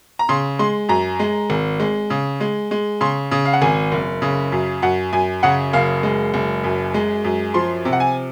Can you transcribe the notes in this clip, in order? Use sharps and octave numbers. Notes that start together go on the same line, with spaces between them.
A#5
C#3 C6
G#3 C6
F#2 A#5
G#3
G#1
G#3
C#3
G#3
G#3
C#3 C6
C#3
F5
F#5
G#1 G#5
F#1
C#3
F#2
F#2 F#5
F#2 G#5
C#3 F#5
F#1 F5
G#3
F#1
F#2
G#3
F#2
F3 C6
C3
F#5
G#5